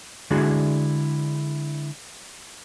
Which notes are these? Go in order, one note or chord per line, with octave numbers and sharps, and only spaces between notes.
D3 G#3 D4 E4 F#4 G#4